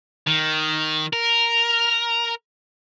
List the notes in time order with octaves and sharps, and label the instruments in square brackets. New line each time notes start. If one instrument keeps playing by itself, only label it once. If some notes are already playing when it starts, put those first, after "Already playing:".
[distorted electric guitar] D#3
A#4